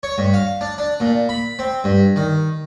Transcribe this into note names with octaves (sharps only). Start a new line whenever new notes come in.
C#5
G2
F5
D4
D4
A#2
B5
C4
G2
D#3